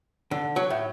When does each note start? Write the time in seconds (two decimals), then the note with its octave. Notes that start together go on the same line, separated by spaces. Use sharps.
0.31 D3
0.56 F#3
0.70 A2